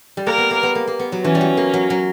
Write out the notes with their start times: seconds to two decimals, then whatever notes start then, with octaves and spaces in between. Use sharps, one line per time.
0.17 G3
0.26 A#3 A#4
0.38 B3
0.51 A#3
0.63 B3
0.75 A#3
0.87 A#3
0.99 B3
1.12 F#3
1.24 E3 C#4
1.35 G3
1.41 F#3
1.57 A#3
1.74 F#3
1.90 F#3